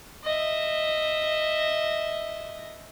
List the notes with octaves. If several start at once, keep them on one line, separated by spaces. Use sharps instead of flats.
D#5 E5